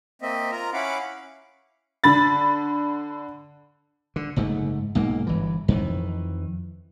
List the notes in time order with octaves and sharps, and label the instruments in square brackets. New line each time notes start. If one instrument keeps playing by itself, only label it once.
[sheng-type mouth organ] A#3 C4 D#5 E5
F4 A#4 A#5
C#4 E4 F5 F#5 B5 D6
[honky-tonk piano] D3 B5 A6
[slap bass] D3
F#1 G#2 A3
B1 G#2 A#3
G1 E3
F2 D#3 E3